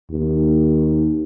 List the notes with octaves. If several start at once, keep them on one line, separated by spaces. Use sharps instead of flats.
D#2